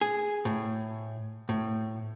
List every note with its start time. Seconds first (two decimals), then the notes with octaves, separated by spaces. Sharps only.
0.01 G#4
0.45 A2
1.49 A2